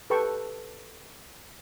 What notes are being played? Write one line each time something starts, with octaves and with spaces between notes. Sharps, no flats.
G4 A4 B4 G5 A5 C#6